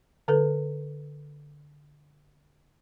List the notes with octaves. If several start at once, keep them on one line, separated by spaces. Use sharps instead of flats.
D3 A4 B4